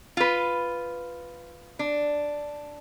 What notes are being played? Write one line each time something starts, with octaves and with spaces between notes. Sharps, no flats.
F4 B4
D4